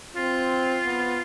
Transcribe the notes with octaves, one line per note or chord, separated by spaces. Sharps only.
C4 F4
B3